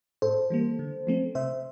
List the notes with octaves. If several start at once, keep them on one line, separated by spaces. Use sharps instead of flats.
A2 A4 C5
E3 G3 A#3
D3
F3 A3 C4
C3 C5 E5